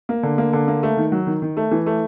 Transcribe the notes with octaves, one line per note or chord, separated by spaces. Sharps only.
A#3
D3
A#3
D3
A#3
A3
D#3
F#3
D#3
D#3
A3
E3
A3